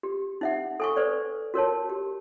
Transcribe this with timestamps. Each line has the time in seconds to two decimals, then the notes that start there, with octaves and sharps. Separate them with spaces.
0.03 G4
0.41 D#4 E5 F#5
0.80 A4 G#5 C#6
0.96 A4 B4 C5 D5
1.54 F#4 A#4 C#5 A5
1.90 G4